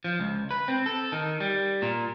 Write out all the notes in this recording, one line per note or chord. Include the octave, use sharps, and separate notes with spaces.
F3
C#2
B4
C4
A4
D#3
G3
A#2